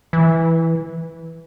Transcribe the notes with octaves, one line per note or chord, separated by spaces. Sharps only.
E3